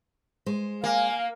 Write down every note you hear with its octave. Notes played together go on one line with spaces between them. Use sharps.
G#3 C5
A#3 F5 G#5